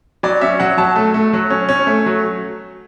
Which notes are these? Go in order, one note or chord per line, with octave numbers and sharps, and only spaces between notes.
F#3 D5
C#4 E5
F#3 F#5
F#3 A5
A3
A3
F#3
C#4
C#4
A3
F#3